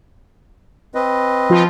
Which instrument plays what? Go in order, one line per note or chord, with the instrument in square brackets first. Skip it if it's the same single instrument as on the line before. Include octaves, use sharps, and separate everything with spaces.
[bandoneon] C4 B4 D#5
[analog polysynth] F3 F4